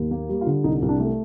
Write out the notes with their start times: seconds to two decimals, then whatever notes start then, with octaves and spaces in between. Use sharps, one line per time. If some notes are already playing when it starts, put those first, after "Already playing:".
Already playing: D#2
0.11 A#3
0.29 G3
0.41 F4
0.47 D3
0.64 C2 D#4
0.82 C2
0.89 D4
1.00 A3